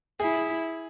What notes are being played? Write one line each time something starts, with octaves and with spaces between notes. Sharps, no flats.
E4 G#4